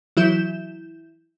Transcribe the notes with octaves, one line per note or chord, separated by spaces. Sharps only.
E3 F#3 E4 G6 E7